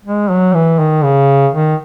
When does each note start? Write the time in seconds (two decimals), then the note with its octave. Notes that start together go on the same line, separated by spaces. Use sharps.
0.05 G#3
0.30 F#3
0.54 E3
0.79 D#3
1.04 C#3
1.53 D#3